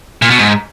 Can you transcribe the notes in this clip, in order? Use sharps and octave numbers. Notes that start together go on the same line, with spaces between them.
A#2
B2
G#2